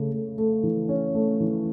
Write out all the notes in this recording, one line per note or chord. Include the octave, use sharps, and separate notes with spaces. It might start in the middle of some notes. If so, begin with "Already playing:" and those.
Already playing: C#3 A3
A3
A3
E3
C#4
A3
E3